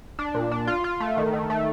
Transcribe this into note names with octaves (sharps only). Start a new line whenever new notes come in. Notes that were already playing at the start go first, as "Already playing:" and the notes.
D4
A#2
D4
F4
F4
A3
D#3
D#3
A3